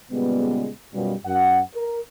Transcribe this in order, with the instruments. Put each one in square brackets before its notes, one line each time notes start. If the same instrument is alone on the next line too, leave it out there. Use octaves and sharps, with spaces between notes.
[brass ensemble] A#2 C#3 G3 G#3 B3
F#2 B2 G3 F4
F#2 F#5
A#4